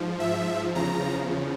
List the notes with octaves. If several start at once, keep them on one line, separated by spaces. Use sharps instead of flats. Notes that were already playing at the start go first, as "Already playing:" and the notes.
Already playing: G#2 F3
E5
E2 C#3 F3 A#5